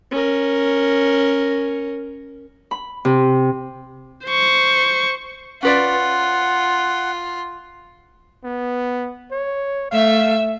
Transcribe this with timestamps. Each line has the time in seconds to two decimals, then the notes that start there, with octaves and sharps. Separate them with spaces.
0.11 C#4 A#4
2.71 B5
3.05 C3
4.26 C5 C#6
5.63 C#4 F4 B4 D5 F#5
8.44 B3
9.31 C#5
9.91 A3 E5 F5